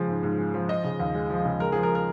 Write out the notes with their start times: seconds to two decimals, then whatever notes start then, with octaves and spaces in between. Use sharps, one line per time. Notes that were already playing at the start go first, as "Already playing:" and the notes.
Already playing: C#3 F3 G#3
0.08 G#2
0.23 G#2
0.38 G#3
0.54 F3
0.69 F3 D#5
0.84 C#3
0.99 D#2
1.14 G#3
1.30 F3
1.45 C#3
1.60 G#3 A#4
1.72 F3 G#4
1.83 A#4
1.95 A#4